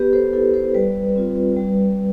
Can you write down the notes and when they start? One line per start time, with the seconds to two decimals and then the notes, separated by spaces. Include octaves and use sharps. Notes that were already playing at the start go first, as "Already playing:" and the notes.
Already playing: B3 G4 B4
0.13 A4 C5
0.33 E4 A4
0.54 A4 C5
0.74 G3 B4 D5
1.16 C4 F4
1.56 G3